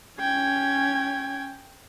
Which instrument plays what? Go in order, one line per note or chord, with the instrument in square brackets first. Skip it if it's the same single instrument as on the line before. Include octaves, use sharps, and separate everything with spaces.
[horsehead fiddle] C#4 [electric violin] G5 G#6